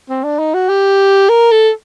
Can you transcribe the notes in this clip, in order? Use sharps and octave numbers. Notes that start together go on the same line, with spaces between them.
C4
D4
D#4
F#4
G4
A#4
A4